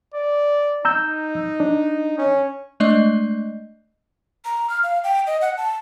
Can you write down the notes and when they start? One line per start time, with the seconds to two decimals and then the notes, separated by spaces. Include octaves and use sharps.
0.14 D5
0.85 D#4 A#5 E6 G6
1.60 D4
2.18 C#4
2.80 G#3 A3 D4 D5 D#5
4.45 A#5
4.69 F6
4.83 F5
5.04 G5
5.27 D#5
5.41 F#5
5.57 A5